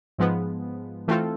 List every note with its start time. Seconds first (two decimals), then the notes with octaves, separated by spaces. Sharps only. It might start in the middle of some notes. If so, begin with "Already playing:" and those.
0.18 G#2 F3 G#3 B3
1.08 E3 A3 C4 F4 A4